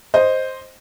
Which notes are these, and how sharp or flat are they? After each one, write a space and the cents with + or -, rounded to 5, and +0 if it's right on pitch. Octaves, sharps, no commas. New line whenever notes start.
C5 +0 D#5 +0